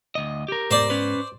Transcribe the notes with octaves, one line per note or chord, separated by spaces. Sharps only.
D2 D#5
G4 A#4
G#2 B3 C5 D5
C#4 B4